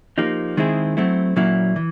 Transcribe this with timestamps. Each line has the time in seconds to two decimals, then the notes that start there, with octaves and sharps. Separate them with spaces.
0.18 F3 A#3 D#4 G4
0.57 D#3 G#3 C4 E4 G#4
0.97 F#3 A3 C4 E4
1.36 A#2 F#3 A#3 C#4 E4
1.76 E3